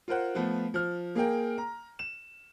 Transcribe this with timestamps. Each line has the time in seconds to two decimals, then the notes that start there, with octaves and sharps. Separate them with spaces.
0.08 F4 A#4 C5 F#5
0.35 F3 A3 B3 F4
0.74 F3 F6
1.15 A#3 G#4 A#4 G5
1.58 A#5
1.99 E7